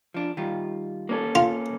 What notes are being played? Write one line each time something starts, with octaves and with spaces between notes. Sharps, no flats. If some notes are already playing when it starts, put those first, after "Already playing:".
F3 D4
D#3 G3 F4
A#3 C#4 A4
F4